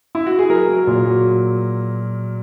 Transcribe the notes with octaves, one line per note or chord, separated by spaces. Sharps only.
E4
F#4
G#4
F#3 A#4
F#3
A#2
F#3